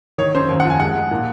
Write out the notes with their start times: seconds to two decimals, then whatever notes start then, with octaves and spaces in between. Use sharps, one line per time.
0.18 D#3 C#5
0.35 F#2 C5
0.49 D#2
0.60 F#5
0.64 F3
0.70 G#5
0.80 G#3 F#5
0.95 G#3
1.11 A#2